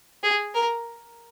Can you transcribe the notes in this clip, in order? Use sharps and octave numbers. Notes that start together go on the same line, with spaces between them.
G#4
A#4